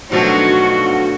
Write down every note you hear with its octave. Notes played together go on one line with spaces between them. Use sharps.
B2 F3 F#3 A3 D4 D#4 F#4 A4